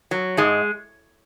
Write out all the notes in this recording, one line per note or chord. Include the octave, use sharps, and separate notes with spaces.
F#3
G#2 G#3